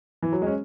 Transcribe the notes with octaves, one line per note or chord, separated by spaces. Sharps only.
E3
F#3
G#3
C#4